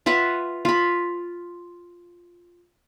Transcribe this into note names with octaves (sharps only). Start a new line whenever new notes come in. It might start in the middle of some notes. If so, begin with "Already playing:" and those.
F4 B4 E5 F#5
F4 B5